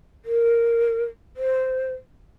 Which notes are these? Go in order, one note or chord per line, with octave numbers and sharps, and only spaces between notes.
A#4
C5